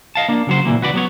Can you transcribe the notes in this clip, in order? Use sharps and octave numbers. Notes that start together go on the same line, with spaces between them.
D#5 F5 A5
A#3 D4
C#3 F#3 C5
A#2 C#3 E3 A#3
C#2 F#4 B4 D5
F#3 B3 C#5